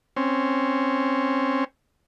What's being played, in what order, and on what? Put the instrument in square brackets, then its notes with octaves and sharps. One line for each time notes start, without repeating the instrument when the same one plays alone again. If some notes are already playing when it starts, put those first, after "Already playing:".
[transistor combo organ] C4 C#4